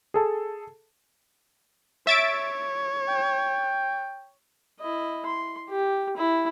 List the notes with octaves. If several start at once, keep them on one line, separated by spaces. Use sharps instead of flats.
G#4 A4 A5
C#5 E5 A6 D7
G5
E4 D#5
C6
G4
E4